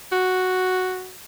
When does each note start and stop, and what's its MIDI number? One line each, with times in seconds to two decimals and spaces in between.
0.12 1.13 66